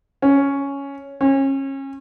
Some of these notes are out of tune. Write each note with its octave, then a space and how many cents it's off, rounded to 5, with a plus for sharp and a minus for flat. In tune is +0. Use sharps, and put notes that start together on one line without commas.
C#4 +5
C#4 -30